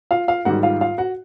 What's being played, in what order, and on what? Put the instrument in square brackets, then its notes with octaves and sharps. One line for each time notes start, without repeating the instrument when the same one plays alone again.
[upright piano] F4 F5
F4 F5
G#2 D#3 G3 F#4 F#5
F4 F5
F4 F5
F#4 F#5